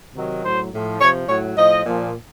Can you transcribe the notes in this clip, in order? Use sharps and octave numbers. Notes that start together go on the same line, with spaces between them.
C3 D#3 F#3
A2 F#3 C5
A2 F3
C3 F3 C#5
A2 F#3 C#5
A2 F3 D#5
A#2 F3